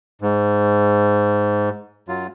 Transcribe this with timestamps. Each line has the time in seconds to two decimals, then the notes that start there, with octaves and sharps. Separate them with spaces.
0.21 G#2
2.09 F#2 F#3 F4